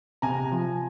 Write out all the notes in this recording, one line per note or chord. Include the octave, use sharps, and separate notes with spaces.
C3 G#5 A#5
F3